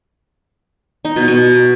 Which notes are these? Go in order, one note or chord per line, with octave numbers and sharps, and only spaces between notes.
D#4
B2
B2